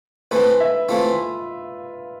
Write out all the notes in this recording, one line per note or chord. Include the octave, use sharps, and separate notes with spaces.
E3 A3 C4 B4
E5
E3 A3 C4 F4